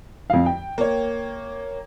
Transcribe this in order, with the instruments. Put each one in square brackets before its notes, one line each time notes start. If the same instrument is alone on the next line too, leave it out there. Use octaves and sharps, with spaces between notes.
[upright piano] F2 F5
G5
[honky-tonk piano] A#3 C#5